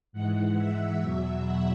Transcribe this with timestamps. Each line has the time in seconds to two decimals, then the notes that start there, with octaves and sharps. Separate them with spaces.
0.13 G#2 E3 G#3 F#5
0.57 E5
1.00 E2 B2 F#3 E5
1.43 F#5